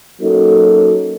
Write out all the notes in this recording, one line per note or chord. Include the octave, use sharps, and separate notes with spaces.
F#3 A#3 C#4 D#4 F#4 A4